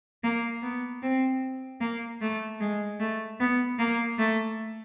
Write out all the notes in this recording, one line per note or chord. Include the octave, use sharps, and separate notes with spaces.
A#3
B3
C4
A#3
A3
G#3
A3
B3
A#3
A3